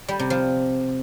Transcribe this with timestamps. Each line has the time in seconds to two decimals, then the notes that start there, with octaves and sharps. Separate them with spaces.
0.08 G3
0.19 C3
0.30 F3